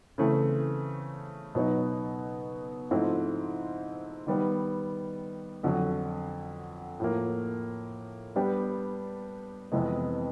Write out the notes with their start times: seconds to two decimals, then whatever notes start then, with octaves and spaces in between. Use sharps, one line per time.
0.18 C#3 E3 A3 C4
1.55 B2 F#3 B3 D#4
2.91 G#2 F3 A3 C4 E4
4.27 D#3 G3 B3
5.63 F2 D3 F#3
7.00 A2 F3 A#3
8.36 G3 B3 D4 G4
9.72 F2 C3 E3 G#3 B3